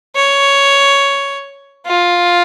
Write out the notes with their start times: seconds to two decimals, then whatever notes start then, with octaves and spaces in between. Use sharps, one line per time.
0.16 C#5
1.87 F4